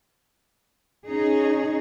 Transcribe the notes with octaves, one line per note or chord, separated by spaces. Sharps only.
C#4 D#4 G#4